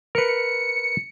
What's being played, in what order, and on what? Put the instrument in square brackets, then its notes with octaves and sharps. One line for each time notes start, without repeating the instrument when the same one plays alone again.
[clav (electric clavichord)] A#4 B4 [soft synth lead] C#7